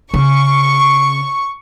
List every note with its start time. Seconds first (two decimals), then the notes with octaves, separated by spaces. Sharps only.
0.14 C#3 C#6